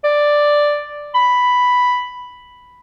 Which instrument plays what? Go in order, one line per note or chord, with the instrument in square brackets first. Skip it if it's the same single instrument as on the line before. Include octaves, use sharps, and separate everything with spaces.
[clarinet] D5
B5